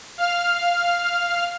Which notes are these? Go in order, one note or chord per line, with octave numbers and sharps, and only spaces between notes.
F5 F6